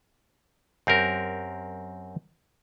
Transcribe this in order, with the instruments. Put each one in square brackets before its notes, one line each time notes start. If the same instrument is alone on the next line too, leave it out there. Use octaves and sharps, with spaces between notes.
[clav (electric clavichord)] F#2 C4 G4 A#4